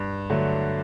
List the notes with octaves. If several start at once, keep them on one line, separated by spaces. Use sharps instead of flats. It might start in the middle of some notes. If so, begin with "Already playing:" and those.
Already playing: G2
D3 F#3 A3